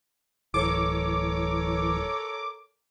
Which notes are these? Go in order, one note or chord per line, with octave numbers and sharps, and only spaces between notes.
D1 E3 A4 A#4 C#5 D6